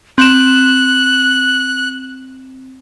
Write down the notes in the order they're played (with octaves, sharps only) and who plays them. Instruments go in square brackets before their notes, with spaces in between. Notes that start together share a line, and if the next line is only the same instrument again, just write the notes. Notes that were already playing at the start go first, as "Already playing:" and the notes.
[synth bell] C4 E7 [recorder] F#6